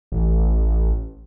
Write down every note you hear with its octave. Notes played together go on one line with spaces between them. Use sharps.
A1